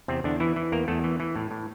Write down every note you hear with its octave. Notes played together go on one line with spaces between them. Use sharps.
E2 C3 C4
E2 D3 D4
E3 E4
E3
E2 A#3 A#4
E2 A3 A4
E3
E3
A2
A2